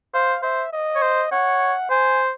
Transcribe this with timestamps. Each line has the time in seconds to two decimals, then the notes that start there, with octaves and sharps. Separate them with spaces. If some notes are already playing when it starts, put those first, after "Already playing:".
0.14 C5 F5
0.43 C5 E5
0.73 D#5
0.96 C#5
1.02 C5
1.32 C#5 F#5
1.90 C5 G#5